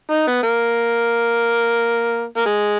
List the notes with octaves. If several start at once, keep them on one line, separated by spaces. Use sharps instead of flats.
D#4
B3
A#3
A#3
G#3